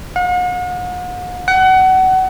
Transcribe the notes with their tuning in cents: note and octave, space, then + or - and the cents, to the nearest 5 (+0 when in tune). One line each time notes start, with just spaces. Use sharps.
F#5 -45
F#5 +25